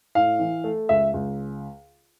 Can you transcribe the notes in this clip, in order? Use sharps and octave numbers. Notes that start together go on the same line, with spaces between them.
A2 F5
E3
A3
C#2 E5
C#2